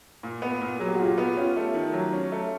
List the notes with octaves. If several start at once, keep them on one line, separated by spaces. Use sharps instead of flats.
A#2
B3
A#2
F#3 G#4
G4
F#4
A#2 F4 G4
B3
C#4 F4 G4
A3
D#3
F#3
C#4
A3